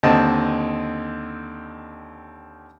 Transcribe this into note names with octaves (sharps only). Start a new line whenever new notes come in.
D#2 D3 C4 D#5 A5